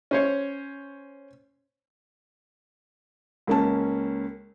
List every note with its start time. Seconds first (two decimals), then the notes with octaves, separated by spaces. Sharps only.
0.11 C#4 C5 C#5
3.47 C#2 A#3 C#4 A5